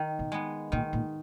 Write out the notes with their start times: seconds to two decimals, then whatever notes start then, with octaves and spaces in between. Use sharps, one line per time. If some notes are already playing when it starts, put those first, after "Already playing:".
Already playing: D#3
0.19 B2
0.32 G#3 B3
0.72 A#2 D#3
0.93 A#2